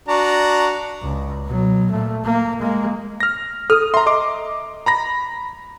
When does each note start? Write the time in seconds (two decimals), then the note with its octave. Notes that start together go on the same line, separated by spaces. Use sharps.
0.08 D4 F#4 A#5
1.02 C#2
1.46 B2 F#3
1.91 A#2 A3
2.25 A#3
2.60 G#3 A#3
3.20 F6 A#6
3.70 A4 D#6 F6
3.94 E5 A#5 C6
4.06 D#5 C6 D6
4.86 A#5 B5 A#6